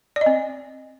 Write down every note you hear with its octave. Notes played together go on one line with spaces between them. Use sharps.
D5
D#5
C4